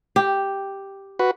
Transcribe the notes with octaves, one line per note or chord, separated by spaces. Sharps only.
G4
F#4 B4